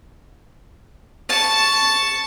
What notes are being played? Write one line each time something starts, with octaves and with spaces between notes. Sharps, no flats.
A5 C#6